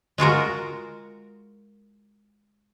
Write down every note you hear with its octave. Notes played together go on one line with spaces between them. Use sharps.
G#3 F4 F#4 A#4